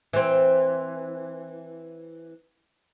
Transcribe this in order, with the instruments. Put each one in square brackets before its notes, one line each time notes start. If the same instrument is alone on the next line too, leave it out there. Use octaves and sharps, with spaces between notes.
[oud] E3 C4